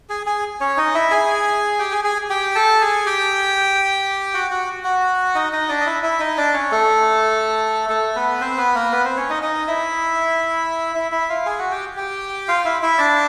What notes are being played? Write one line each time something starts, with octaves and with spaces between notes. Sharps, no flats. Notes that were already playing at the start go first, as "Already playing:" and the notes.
G#4 G#5
G#4 G#5
C#4 C#5
D#4 D#5
E4 E5
G#4 G#5
G4 G5
G#4 G#5
G#4 G#5
G4 G5
A4 A5
G#4 G#5
G4 G5
F#4 F#5
F#4 F#5
F#4 F#5
D#4 D#5
D#4 D#5
D4 D5
D#5
E4 E5
E4 E5
D#4 D#5
D4 D5
C#4 C#5
A3 A4
A3 A4
B3 B4
C4 C5
B3 B4
A#3 A#4
B3 B4
C4 C5
C#4 C#5
D#4 D#5
D#4 D#5
E4 E5
E4 E5
E4 E5
F4 F5
G#4 G#5
F#4 F#5
G4 G5
G4 G5
F4 F5
E4 E5
E4 E5
D4 D5